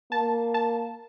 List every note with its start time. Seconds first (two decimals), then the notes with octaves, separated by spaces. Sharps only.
0.12 A#3 A5
0.54 A5